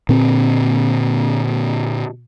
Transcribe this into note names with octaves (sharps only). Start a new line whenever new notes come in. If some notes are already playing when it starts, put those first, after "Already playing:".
A#2 D3 C4